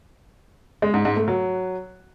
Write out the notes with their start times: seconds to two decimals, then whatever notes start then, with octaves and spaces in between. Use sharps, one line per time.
0.82 G#3
0.94 G#2
1.05 G#2
1.16 A3
1.28 F#3